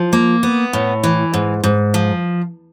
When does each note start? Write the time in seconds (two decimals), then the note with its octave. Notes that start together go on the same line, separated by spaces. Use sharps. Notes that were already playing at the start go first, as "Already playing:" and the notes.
Already playing: F3
0.13 A#3
0.43 B3
0.73 A2
1.04 E3
1.34 G#2
1.64 G#2
1.94 F3